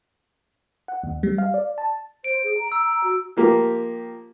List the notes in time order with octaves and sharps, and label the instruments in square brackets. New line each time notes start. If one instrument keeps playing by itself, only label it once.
[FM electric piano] F#5
D#2
G3
F5
D5
A5
[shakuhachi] C5 [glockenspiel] D7
[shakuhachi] G#4
A#5
[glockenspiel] E6
[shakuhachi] F#4
[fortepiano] F3 A#3 G4